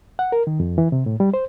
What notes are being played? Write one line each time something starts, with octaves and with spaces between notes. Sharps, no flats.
F#5
A#4
D#3
F2
E3
C3
A2
G3
C5